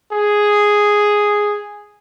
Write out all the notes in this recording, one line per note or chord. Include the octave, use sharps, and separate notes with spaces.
G#4